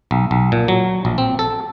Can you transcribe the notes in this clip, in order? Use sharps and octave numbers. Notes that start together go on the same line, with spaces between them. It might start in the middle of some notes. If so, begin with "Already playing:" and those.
B1
B1
A#2
F#3
A#1
C4
A4